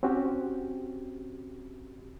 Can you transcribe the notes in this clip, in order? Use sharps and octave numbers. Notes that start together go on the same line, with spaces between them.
C4 C#4 F#4 G4